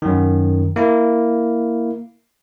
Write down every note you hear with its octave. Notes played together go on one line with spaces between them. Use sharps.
F#2 D#3
A#3 E4